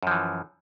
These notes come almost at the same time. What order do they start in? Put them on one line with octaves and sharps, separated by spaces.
F#2 F3 E3